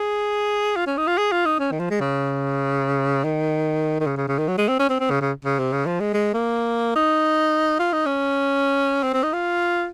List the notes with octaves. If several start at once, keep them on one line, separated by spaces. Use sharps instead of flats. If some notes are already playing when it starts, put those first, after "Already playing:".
Already playing: G#4
F4
C#4
D#4
F4
G#4
F4
D#4
C#4
D#3
F3
G#3
C#3
D#3
D#3
C#3
C#3
C#3
D#3
F#3
G#3
C4
C#4
C4
C4
C#3
C#3
C#3
C3
C#3
F3
G#3
G#3
A#3
D#4
F4
D#4
C#4
C4
C4
D#4
F4